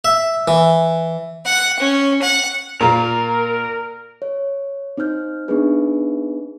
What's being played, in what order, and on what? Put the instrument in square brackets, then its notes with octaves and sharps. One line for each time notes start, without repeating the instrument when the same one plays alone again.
[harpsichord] E5
E3
[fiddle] F#5
C#4
F#5
[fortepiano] A#2 A#3 [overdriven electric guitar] A#4
[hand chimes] C#5
C4 D#4 C5 F6 G6
B3 C4 D4 D#4 G#4 B4